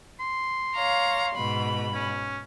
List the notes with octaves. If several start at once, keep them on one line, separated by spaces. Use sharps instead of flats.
C6
C#5 F5 A#5
G#2 B2 B5
C#4